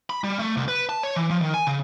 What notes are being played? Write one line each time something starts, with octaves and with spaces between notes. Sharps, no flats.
B5
G3
A3
C2
B4
A5
C#5
E3
F3
D#3
G#5
C#3